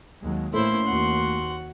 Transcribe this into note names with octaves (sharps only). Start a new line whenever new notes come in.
D#2 F#3 G#3
A1 A3 A#3 C#4 E4 C5 C6
D#2 F#4 F#5